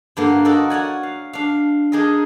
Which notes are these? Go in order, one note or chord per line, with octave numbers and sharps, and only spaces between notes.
G2 D3 A#3
D#4 F#4 A4 A#4 D5
C#5 D5 F#5 G#5
F5
D4 F5
D4 D#4 G#4 A#4 D#5